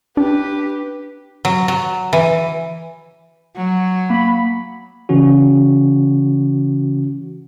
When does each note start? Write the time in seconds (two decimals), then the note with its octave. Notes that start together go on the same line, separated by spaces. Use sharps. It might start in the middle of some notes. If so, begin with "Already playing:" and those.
0.17 D4 G4 B4
1.45 F#3
1.68 F#3
2.13 E3
3.56 F#3
4.10 A#3 B5
5.09 C#3 E3 C#4 F#4